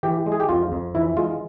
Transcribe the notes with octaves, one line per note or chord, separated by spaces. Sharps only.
E3 G4
G#3
G#4
G4
F2 F4
F2
E3 E4
G#3 F4